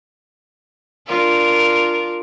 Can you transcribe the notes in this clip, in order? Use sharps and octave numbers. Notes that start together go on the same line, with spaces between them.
D4 F4 A#4